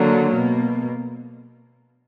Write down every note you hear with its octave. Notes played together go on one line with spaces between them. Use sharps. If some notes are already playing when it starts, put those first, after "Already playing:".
Already playing: D3 F#3 A#3
B2 A#3